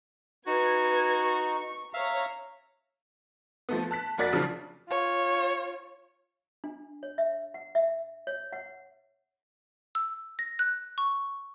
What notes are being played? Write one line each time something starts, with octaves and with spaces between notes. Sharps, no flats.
D#4 F#4 B4 G#6
C#6
C#5 E5 F5 A#5
F3 A3 B3
A5 F#6 B6
F1 A#3 F#4 D5 A6 B6
C#3 F3 F#3 D4
F4 C#5
D4
C#5
E5
F#5
E5
C#5
F#5
E6
A#6
F#6
C#6